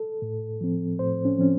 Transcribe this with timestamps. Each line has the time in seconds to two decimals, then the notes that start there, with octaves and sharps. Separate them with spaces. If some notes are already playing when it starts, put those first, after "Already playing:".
Already playing: A4
0.22 A2
0.61 F3 C4
0.99 A2 C5
1.25 C#4
1.38 F3 C4 C#4